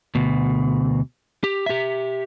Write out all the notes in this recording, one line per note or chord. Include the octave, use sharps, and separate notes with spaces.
D2 B2
G4
G4 E5